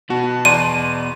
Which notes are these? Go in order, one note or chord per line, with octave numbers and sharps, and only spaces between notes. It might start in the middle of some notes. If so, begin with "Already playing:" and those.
B2 F#4 A5
E2 D5 C6 D#7